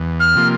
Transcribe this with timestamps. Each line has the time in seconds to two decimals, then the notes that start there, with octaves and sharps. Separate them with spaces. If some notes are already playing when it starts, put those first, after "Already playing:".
Already playing: E2
0.19 F6
0.35 C3 F3 A#3